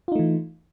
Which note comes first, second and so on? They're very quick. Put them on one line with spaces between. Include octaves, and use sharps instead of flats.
F4 D#4 A3 E3